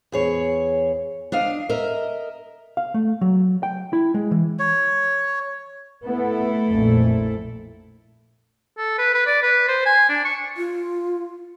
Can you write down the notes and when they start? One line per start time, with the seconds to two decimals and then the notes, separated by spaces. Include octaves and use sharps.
0.12 E2 G#4 C#5
1.32 D4 D#5 F5
1.69 A#4 D#5 E5
2.77 F5
2.94 A3
3.21 F#3
3.63 G5
3.93 E4
4.14 G#3
4.31 E3
4.59 C#5
6.04 A3 B3 E4 A4
6.70 A#1 F2 A#2
8.78 A4
8.98 B4
9.15 B4
9.27 D5
9.43 B4
9.68 C5
9.86 G#5
10.10 D4
10.25 C#6
10.57 F4